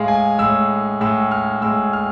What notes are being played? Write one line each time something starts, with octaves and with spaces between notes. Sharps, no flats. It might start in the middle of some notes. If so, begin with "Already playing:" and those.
Already playing: A2 G#3 F5
G#5
A2 G#3 E6
A2 G#3 E6
F6
A2 G#3 E6
F6